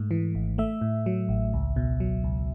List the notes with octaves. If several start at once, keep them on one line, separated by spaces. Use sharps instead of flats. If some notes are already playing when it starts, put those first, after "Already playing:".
Already playing: G#2 A3
E3
G#1
A3 E5
A2
F#3
A1
C#2
B2
F#3
C#2